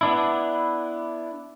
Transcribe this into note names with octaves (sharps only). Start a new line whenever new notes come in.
B3 D4 E4